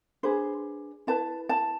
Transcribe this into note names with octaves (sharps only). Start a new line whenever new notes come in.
D4 G#4 B4 C5
E4 B4 A5
A5